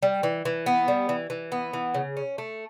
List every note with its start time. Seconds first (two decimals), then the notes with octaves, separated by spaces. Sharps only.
0.03 G3
0.23 E3
0.45 E3
0.66 B3
0.88 G3
1.09 E3
1.30 E3
1.52 B3
1.73 E3
1.94 C#3
2.17 C#4
2.38 A3